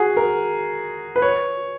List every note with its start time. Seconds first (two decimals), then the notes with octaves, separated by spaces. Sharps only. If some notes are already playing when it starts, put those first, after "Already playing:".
Already playing: F#4 G#4
0.17 A#4
1.16 B4
1.22 C#5